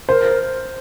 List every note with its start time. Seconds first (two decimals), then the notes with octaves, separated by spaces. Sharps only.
0.08 A#4 C5